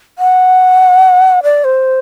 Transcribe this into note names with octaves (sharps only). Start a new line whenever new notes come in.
F#5
D5
C5